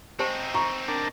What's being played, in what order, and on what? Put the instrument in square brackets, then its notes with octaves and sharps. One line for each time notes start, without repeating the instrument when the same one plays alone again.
[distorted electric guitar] C4 D#4 [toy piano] G4 C5 A5
[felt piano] A#5 [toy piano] C#6
[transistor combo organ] D4 A#4 A5